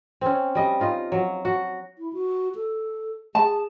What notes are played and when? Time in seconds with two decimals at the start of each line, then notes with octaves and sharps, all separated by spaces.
0.21 C4 C#4
0.55 G3 D#5
0.80 D#4 F4 D#5
1.12 F#3
1.45 F#4
1.98 E4
2.13 F#4
2.55 A4
3.35 G#4 A5